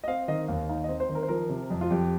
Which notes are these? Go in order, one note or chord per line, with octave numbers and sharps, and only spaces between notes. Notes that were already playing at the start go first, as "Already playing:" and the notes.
D#5
C4 F5
D#3 D#5
D#2 F5
D#4 F5
C4 D#5
C5
D#3
A#4
C5
F3 A#4
C3
F2
F4
F2 G4